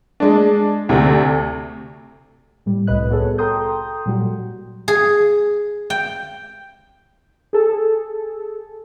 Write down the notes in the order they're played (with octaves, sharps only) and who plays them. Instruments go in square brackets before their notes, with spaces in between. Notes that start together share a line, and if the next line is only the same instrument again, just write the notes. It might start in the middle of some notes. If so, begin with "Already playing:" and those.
[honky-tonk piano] G#3 D4
D2 C3
[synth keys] A2 G3
C2 A2 C3 B4 D#5 F#6
B3 F#4 G#4 A4 C#5
A4 G5 A#5 C6 D#6 G6
A#2 F#3 G3 F#4
[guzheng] G#4
G5
[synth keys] G#4 A4